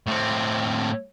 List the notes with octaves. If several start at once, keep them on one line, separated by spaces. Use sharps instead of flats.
A2 C4